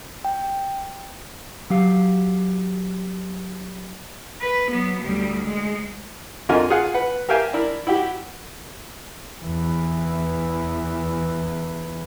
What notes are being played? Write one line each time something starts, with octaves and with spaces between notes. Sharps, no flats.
G5
F#3 G4 F5
B4
F#3 B3
D2 G3
G#3
F2 D3 F4 A#4 D#5 G#5
F4 G#4 F5 F#5 G#5
B4 F#5
G4 A#4 E5 F5 G5 G#5
D4 E4 A#4
E4 F#4 G4
E2 E3